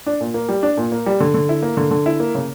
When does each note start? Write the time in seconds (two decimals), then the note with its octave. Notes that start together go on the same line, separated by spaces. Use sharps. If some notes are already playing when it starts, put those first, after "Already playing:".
0.06 D4
0.20 A#2
0.34 A#3
0.49 G3
0.63 D4
0.77 A#2
0.92 A#3
1.06 G3
1.20 D3
1.34 D3
1.49 E4
1.62 A#3
1.77 D3
1.91 D3
2.06 E4
2.20 A#3
2.35 C#3